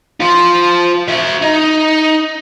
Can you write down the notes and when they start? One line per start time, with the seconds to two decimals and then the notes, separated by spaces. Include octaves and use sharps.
0.20 F4 C5
1.08 F#4 E5
1.42 D#4